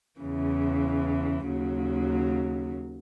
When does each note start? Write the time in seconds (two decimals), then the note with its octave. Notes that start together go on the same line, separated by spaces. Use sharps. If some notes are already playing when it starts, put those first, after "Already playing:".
0.20 E2 C#3 E3
1.47 D#2 C#3 F#3